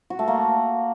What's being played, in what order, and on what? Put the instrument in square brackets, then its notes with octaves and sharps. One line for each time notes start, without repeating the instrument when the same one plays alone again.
[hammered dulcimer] F#4
A3
A#3